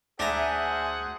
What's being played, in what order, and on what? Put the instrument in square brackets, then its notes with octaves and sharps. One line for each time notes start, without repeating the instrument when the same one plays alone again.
[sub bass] D2 [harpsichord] D4 A#5 [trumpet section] G#4 C5 F#5 [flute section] E5 G#5